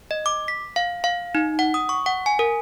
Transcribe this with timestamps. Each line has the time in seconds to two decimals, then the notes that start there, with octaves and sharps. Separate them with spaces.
0.11 D#5
0.26 D6
0.48 B6
0.76 F5
1.04 F5
1.35 D#4
1.59 F#5
1.74 D#6
1.89 C#6
2.06 F#5
2.26 G#5
2.39 A#4